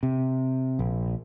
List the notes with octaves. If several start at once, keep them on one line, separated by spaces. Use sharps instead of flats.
C3
A#1